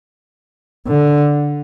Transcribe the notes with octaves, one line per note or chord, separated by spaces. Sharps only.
D3